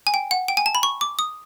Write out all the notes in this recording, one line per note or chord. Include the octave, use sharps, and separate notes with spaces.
G#5
G5
F#5
G5
G#5
A5
B5
C#6
D6
D#6